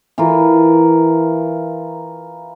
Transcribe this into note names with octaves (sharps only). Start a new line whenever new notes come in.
E3 F4 A#4